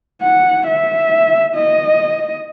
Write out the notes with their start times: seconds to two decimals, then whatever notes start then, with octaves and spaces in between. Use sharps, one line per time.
0.22 F#5
0.66 E5
1.55 D#5